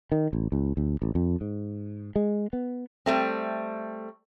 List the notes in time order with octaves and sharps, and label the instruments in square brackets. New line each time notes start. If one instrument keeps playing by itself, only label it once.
[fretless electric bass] D#3
A1
C#2
D2
A1
F2
G#2
G#3
B3
[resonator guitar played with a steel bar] G3 A3 C4